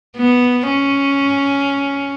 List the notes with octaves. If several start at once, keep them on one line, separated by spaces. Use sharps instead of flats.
B3
C#4